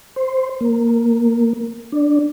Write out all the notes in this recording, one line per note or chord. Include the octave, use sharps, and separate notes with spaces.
C5
A#3
D4